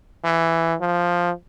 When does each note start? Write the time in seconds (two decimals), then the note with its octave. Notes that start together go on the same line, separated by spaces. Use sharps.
0.25 E3
0.81 F3